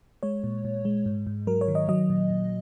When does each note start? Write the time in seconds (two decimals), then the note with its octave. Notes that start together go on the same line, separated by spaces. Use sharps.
0.23 G#3 C#5
0.44 A#2
0.65 A#2
0.85 G#3
1.06 G#2
1.27 G#2
1.47 F#3 A#4
1.61 C#5
1.68 D#3
1.75 D#5
1.89 F#3 D#5
2.10 A#2
2.31 A#2